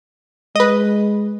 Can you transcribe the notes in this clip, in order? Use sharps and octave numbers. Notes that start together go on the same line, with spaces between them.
G#3 B4 D#5